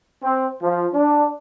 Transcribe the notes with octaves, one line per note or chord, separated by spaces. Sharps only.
C4
F3
D4